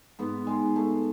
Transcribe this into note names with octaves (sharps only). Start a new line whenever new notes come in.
G#2 B3
G#3
G#2
A3